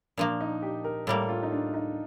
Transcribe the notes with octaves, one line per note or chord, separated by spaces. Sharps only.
A#2 F3 A#3 D4
D#4
G4
A#4
A2 G3 A#3 A4
F4
D#4
D4
D#4